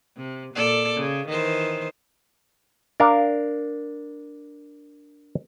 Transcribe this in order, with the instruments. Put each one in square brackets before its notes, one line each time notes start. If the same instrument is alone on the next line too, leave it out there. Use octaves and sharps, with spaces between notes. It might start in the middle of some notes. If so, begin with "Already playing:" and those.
[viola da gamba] C3
A#2 A4 D5
C#3
D#3 E3 C5
[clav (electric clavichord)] D4 A#4 F5